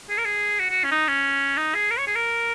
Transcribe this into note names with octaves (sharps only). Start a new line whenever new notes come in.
G#4
A#4
G#4
F#4
F#4
C#4
D#4
C#4
D#4
G#4
A#4
C#5
G#4
A#4